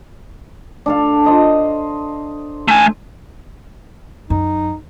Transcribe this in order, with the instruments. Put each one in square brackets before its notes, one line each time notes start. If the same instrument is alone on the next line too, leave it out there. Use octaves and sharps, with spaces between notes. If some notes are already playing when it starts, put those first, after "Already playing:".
[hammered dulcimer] D4 A4 F5
C5 D#5 A#5
[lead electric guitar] A3 G#5
[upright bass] F#2 [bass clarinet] D#4